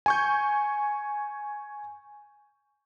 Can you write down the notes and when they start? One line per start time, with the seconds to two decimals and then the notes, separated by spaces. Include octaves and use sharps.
0.06 G#5 C#6 G6